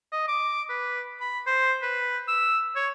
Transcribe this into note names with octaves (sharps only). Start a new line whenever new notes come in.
D#5
D6
B4
B5
C5
B4
E6
C#5